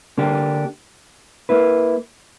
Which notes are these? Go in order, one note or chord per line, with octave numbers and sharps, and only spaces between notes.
D3 A#3 D4 G4
A#3 E4 B4